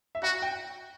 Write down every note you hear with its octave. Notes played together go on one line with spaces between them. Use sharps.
E5
F#4 F#5
G5